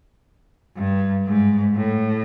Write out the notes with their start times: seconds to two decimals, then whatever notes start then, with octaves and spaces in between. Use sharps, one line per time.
0.76 G2
1.26 G#2
1.75 A2